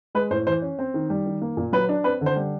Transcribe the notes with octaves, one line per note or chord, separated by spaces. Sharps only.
G#3 B4
A2 C5
E3 C5
C#4
C4
D#3
G3
D#3
A#3
A#2
F#3 B4
D4
C4 B4
D3
C5
G3